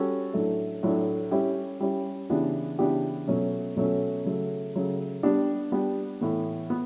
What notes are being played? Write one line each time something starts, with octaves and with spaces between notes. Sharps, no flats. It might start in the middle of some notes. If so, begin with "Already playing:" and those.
Already playing: G3 C#4 F#4 A4
A2 F#3 A3 D4
A2 F#3 A3 D4
G3 C#4 E4 G4
G3 C#4 E4 G4
C#3 E3 B3 D4 G4
C#3 E3 B3 D4 G4
B2 F#3 A3 C#4
B2 F#3 A3 C#4
C#3 F#3 A3
C#3 F#3 A3
G3 B3 D4 G4
G3 B3 D4 G4
A2 E3 B3
B3